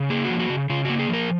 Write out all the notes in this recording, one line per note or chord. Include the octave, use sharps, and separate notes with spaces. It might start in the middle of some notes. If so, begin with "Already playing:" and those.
Already playing: C#3
A#3 G#4
F#4
F3
F#4
C#3
C#3 F4
A#3 F#4
G#4
F3 A#4